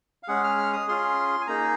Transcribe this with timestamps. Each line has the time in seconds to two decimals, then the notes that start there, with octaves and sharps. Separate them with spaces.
0.23 F5
0.28 G#3 C#4 G#4 F#5
0.44 F6
0.58 F6
0.73 D#6
0.88 C#4 F4 G#4 C6
1.41 G#5
1.47 A#3 D#4 G#4 A#5